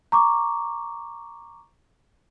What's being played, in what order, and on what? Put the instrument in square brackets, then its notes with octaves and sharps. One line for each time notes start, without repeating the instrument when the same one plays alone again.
[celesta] A#5 C#6 D6